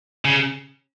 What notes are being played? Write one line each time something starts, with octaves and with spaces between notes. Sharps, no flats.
C#3